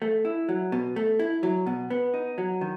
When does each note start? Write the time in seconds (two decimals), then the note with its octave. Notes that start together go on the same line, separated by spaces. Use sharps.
0.02 A3
0.25 E4
0.49 F#3
0.72 B2
0.96 A3
1.19 E4
1.43 F#3
1.66 B2
1.90 B3
2.14 D#4
2.38 F#3
2.61 D#3